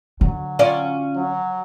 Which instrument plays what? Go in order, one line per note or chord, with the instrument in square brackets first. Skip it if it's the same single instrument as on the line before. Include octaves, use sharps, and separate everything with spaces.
[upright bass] D3 [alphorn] F#3
[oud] C#4 F4 D5
[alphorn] F#3